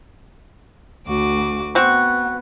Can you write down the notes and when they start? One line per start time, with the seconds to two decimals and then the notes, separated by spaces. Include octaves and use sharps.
1.07 D2 F#4 D6
1.75 B3 C4 F#4